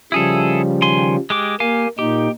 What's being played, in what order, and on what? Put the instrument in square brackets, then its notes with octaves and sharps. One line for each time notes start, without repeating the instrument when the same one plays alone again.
[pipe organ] C#3 F3 G3 [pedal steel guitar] E4 G#4 A4
[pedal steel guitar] D#3 G#5 C6
G#3 G4 D6
[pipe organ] A#3 [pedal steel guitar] G4 F5 G#5
[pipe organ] A#2 D#4 [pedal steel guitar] G4